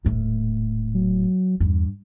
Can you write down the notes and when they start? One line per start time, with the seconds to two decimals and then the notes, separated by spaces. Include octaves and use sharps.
0.05 D#1 A2
0.94 F#3
1.60 E2 G2